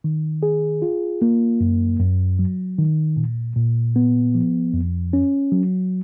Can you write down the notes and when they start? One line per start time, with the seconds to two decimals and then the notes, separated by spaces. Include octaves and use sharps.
0.04 D#3
0.43 G#4
0.82 F4
1.22 A#3
1.61 F#2
1.99 F#2
2.39 F#3
2.78 D#3
3.17 A#2
3.56 A#2
3.96 B3
4.35 F3
4.74 F2
5.13 C#4
5.52 F#3